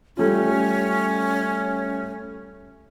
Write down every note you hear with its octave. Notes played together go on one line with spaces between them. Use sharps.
G3 A3 C#4 F4